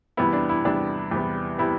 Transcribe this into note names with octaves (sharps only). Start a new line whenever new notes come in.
E2 C3 G3 B3 E4
D4
E4
E2 C3 G3 B3 D4
E2 C3 G3 B3
C3 G3 B3 E4